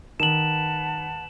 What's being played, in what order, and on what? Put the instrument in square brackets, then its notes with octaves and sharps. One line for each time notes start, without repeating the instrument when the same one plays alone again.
[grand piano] D#3 [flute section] B4 F#5 A5 [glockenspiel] E7 F#7